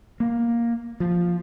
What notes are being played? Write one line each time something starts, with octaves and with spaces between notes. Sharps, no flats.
A#3
F3